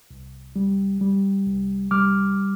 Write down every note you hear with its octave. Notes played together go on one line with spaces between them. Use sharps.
C2
G3
G3
C2
G3 D6 F6